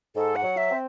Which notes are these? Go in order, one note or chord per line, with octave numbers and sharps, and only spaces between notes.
G#2 A4
F#5
F#3
E5
C4